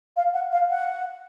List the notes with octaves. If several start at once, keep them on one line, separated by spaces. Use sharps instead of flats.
F5
F#5
F5
F#5